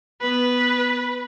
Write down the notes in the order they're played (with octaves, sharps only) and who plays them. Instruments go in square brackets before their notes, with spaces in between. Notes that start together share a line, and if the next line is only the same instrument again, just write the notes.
[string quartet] B3 [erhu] B4